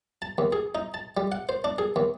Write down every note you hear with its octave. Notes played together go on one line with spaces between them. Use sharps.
A5
D#2
G#4
D#4
A5
G3
F#5
C5
D4
G#4
D#2